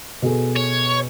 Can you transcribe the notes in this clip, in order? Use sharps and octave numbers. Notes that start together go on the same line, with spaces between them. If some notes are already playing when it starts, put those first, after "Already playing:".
B2 G#4 A4
C#5